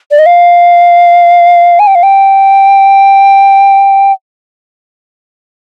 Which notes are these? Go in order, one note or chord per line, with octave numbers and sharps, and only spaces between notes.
D5
D#5
F5
G#5
G5
F5
G5